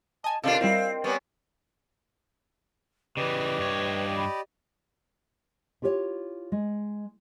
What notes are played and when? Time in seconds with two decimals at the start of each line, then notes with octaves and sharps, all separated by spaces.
0.24 D#5 G#5 A5
0.44 C3 D4 F4 A4 A#4 D#5 F5
0.61 G3 C4 E4 F4
1.04 G3 B3 C4 B4 C#5 G#5 C#6
3.17 C#3 E3 G4 B4 D5 D#5
3.59 G2 C#5
4.16 B5
5.82 E4 F4 G4 A#4 C#5
6.52 G#3